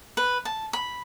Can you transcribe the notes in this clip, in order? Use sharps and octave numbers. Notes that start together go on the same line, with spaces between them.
B4
A5
B5